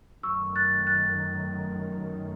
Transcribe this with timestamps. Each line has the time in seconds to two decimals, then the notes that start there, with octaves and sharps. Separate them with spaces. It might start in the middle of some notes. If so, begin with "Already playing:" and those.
0.23 F#2 D#3 A3 C#6 E6
0.56 F#6 A6
0.87 F#6 A6